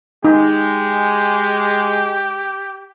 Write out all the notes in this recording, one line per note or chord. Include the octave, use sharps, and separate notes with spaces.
G#3 D#4 G4